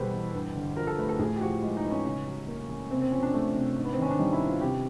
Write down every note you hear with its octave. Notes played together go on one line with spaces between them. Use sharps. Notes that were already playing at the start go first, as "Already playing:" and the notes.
Already playing: E2 B2 G3 G#4 A4 B4 C5
E2
G2
D3
F3 A#4
A4
A3 B4
A4
A2 G#4
G4
F3 F#4
G#3
D#4
B3
C#4
C#3
F#3
A#3
C#3
C3 C4
C4
F3 C#4
D4
A3
C3
G#2
B3
C4
D#3 C#4
D4
G3 D#4
E4
B3
F4
C3 G4